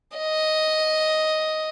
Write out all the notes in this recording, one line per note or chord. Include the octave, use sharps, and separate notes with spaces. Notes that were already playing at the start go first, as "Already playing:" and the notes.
D#5